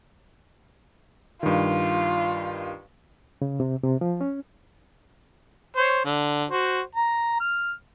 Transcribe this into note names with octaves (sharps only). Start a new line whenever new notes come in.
G2 D#3 F4
C#3
C3
C3
F3
C#4
C5 C#5
D3
F#4 C5
A#5
F6